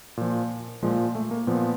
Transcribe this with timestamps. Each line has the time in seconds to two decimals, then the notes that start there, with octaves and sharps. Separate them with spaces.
0.17 A#2 F3
0.83 A#2 F3 G#3
1.15 A3
1.31 A#3
1.47 A#2 F3 B3